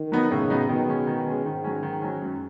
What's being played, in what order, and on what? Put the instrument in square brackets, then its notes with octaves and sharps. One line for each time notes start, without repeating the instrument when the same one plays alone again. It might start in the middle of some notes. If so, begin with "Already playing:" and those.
Already playing: [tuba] D#3
[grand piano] F#3 B3 D#4
[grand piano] A2 [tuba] C#3
[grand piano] F#3 B3 D#4
[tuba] B2 [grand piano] D#3
[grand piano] G#3 C#4
D#3
G#3 C#4
[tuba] G#2 [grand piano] D#3
[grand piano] F#3 C#4
D#3
F#3 C#4
F#2